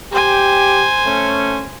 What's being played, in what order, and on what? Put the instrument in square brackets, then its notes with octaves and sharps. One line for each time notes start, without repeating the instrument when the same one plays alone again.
[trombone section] G4 [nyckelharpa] C5 G#5
[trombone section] A3 C#4